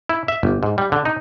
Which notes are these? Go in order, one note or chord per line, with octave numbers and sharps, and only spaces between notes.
E4
E5
G1
G#2
G3
D3
D#4